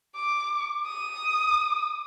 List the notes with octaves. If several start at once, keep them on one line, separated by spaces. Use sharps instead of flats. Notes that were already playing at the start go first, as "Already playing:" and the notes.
D6
D#6